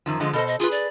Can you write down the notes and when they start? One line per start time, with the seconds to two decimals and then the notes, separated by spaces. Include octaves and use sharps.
0.06 F#2 D#3 F3
0.20 D3 F3 G#3 D#5
0.33 B2 A4 C5 D#5
0.47 D#5
0.60 F4 G#4 B4
0.72 D5